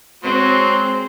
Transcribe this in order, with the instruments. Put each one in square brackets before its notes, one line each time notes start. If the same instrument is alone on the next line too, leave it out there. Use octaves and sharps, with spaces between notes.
[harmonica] F#3 [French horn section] G#3 [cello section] C4 [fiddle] C5